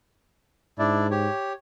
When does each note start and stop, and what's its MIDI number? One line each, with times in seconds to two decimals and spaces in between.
0.79 1.28 44
0.79 1.07 62
0.79 1.07 64
0.79 1.07 74
1.11 1.53 67
1.11 1.53 73